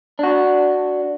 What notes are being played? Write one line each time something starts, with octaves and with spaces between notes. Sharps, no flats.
D4 F#4